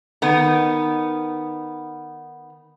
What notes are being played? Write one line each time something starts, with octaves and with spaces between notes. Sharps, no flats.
D#3 B3